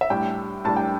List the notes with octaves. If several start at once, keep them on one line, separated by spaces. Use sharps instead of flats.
E5
A2 G3 D4 G5
A2 G3 D4 A5
G5